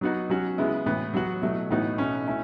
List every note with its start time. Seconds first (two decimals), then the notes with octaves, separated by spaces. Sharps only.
0.01 F#3 B3 D#4 F#4
0.29 F#3 C#4 F#4
0.58 C#3 G#3 B3 E4
0.86 A2 E3 B3
1.14 F#3 B3 F#4
1.42 B2 F#3 A3 E4
1.70 A2 E3 B3 D#4 F#4
1.98 B2 A3 C#4
2.27 A3 C#4 E4